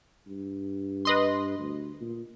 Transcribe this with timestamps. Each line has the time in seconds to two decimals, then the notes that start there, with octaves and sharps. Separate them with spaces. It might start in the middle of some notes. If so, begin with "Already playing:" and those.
0.27 G2
1.05 B4 D#5 C6
1.59 D2
2.01 A#2